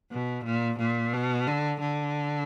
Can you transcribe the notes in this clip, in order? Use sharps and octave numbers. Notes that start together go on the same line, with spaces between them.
B2
A#2
A#2
B2
D3
D3